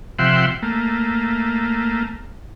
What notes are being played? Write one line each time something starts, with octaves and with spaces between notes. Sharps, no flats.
C3 F3 E5 F#5 G5 C6
A3 A#3